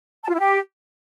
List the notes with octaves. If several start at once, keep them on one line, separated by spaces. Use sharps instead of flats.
A5
F4
E4
G4